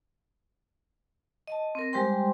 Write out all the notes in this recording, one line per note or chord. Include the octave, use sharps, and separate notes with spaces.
D#5 A5
C4 A#4
G3 G#3 G4 C5 G5 C6